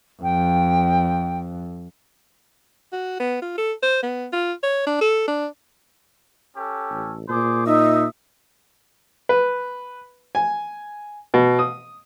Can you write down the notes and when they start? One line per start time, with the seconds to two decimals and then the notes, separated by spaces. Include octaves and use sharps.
0.23 F2 G5
2.93 F#4
3.20 B3
3.42 F4
3.58 A4
3.83 C5
4.03 B3
4.33 F4
4.63 C#5
4.87 D4
5.01 A4
5.28 D4
6.57 C#4 G4 A4
6.90 A1
7.29 A#2 G#4 C5 D6
7.66 D#4 D#5 E5
9.29 B4
10.35 G#5
11.34 B2
11.59 D#6